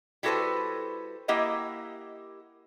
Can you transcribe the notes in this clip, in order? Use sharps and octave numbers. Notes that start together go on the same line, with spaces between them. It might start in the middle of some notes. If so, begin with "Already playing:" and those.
G3 E4 F#4 A4 B4 C5
A#3 E4 G4 D#5 F#5